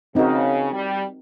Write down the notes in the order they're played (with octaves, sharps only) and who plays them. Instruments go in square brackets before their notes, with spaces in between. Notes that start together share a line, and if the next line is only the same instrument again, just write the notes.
[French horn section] C#3 [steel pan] C4 D#4 F#4 A#4
[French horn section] G3